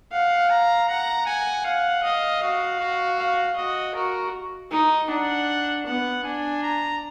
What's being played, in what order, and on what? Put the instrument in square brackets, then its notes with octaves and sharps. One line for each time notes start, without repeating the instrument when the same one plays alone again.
[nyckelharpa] F5 [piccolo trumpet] F#5
[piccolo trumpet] A#5
[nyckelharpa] F#5 [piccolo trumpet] A#5
[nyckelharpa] F#5 [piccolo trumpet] G#5
[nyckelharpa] F5 [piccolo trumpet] F#5
[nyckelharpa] D#5 [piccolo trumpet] F5
[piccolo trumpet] F#4 [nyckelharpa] F5
[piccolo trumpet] F#4
[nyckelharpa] F5
[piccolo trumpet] F#4 [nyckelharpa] D#5
[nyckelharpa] F#4 [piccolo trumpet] A#4
[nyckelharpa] D#4
[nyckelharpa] D4 [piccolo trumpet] F#5
[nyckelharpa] B3 [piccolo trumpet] F#5
[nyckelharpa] D4 [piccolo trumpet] G#5
[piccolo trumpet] A#5